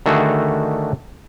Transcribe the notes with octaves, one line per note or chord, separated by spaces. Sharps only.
D3 D#3 A3 F#4 G#4